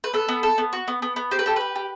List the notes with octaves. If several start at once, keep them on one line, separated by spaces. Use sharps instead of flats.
B4
B3 A4
B3
A4
B3
F#4
B3
B3
B3
G4 C5
B4
G4 A4
G4 B4
G4